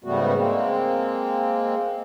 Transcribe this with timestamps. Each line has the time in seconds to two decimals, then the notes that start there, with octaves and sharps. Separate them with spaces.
0.04 G#2 C#3 G3 A3 B3 F#4
0.37 G#3 A#3 C4